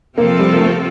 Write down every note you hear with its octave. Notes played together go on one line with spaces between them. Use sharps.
C3 F3 A#3 C4 F4 A4
G3
A#3
A3